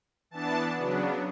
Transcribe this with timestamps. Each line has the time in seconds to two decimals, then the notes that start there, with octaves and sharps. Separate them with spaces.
0.31 E3 B3 D4 A5
0.77 C#3 F#3 B3 D4